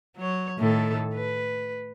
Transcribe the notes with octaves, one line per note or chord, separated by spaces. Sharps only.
F#3 C#5
A2 D#3 A4
B4